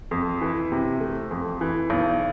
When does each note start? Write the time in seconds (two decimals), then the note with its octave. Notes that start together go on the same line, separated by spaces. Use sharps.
0.11 F2
0.41 E3
0.72 C3
1.01 A3
1.31 F2
1.61 E3
1.90 B1